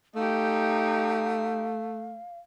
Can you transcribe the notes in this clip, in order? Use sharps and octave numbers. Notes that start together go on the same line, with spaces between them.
A3 D#4 G4 F5